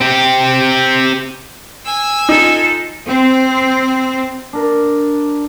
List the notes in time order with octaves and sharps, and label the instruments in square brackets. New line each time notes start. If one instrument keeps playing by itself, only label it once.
[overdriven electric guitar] C4 G4
[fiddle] G#5 E6
[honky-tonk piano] D#4 [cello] F4 A4
[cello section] C4
[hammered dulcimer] D4 A#4